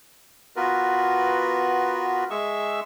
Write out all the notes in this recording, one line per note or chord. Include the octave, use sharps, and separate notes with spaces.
B3 F4 F#4 A#4 B4
G#3 G#4 E5 C#6 E6